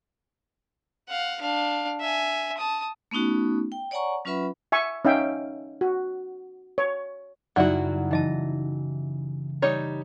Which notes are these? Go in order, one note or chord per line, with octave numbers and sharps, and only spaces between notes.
F5 F#5
D4 F5
E5 G#5
A5 D#6
A3 B3 C#4 D#4 F#4
G5
C#5 D5 F#5 G#5 A#5 C#6
F#3 C#4 F4 B4 E5 B5
E5 G#5 C#6
C#4 D#4 E5 F5 G5
F#4
C#5
F#2 C#3 F#3 G3 D#4 E4 F#4 D5
E3 D#4 D#5 A5 A#6
G3 D#4 C#5 D#5